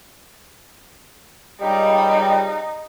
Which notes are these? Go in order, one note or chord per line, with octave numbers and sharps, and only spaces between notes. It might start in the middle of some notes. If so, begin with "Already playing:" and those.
C#2 G3 D#4